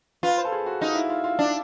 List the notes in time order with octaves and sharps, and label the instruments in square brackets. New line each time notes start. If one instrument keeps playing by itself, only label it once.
[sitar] F4 [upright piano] B4
[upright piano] C5
A4
G#4
F#4
[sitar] D#4 [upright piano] F4
[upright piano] E4
F4
F4
[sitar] D4